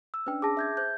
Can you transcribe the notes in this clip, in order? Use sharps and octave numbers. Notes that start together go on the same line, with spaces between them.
E6
C#4 D4 B4 G5 E6
G#4 A5 D6 A#6
E5 G6 G#6
C5 G6